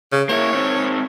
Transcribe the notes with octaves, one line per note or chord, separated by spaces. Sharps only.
C#3
A#3 E4 C#5
D#3 C4